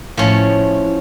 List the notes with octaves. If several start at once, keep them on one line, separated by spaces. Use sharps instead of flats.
A2 F3 C#4